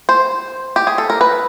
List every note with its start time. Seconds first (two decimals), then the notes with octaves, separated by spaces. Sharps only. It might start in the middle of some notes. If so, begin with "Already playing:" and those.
0.09 C5
0.76 G4
0.87 G#4
0.98 A4
1.10 A#4
1.21 B4